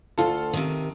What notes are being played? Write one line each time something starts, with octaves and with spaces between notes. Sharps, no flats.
D2 F4 A4
C3 D#3